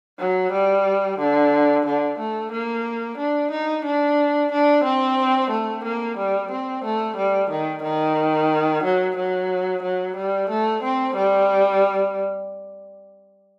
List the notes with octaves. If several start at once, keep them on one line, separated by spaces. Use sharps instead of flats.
F#3
G3
D3
D3
A3
A#3
D4
D#4
D4
D4
C4
A3
A#3
G3
C4
A3
G3
D#3
D#3
F#3
F#3
F#3
G3
A3
C4
G3